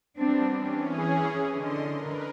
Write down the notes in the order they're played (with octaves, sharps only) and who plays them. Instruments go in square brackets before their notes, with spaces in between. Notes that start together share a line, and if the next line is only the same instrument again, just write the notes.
[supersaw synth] G3 B3 [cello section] C4 D4
[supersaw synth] E3 C#4
[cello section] G#4
[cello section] D3 [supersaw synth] D#5 C6
[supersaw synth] A#4 B4